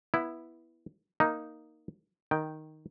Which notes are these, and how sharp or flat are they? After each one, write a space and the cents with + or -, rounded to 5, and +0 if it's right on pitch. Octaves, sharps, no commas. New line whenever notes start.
B3 -10 E4 +0
A#3 +0 D#4 +0
D#3 +0 G5 +0